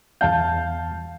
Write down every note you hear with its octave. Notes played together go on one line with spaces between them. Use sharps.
E2 F5 A5 G6